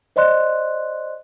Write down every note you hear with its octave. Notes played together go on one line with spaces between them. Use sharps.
C5 D5 D#5 C6 F#6